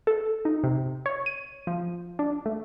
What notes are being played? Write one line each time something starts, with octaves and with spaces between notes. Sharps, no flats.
A4
D#4
C3
C#5
D#7
F3
D4
A3